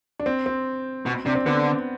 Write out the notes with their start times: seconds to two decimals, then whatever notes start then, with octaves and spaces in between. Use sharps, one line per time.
0.19 D4
0.26 C4
0.46 C4
1.06 B2
1.26 C3 D4
1.35 C4
1.46 D3 B3